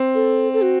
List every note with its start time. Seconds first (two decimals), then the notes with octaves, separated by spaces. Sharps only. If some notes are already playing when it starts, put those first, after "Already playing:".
Already playing: C4
0.15 A4
0.54 A4
0.63 F#4